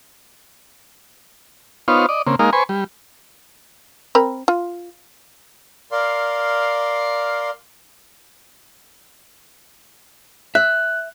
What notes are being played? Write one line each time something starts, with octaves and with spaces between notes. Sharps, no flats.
B3 D#4 F4 C5 C#5 F5
D5 D#5
C#3 A#3 C4
G#3 A#3 D#4 A#4 F5
B4 C5 G#5 C#6
G3
C4 A#4 B5
F4
A#4 D5 F5 C6
E5 F#6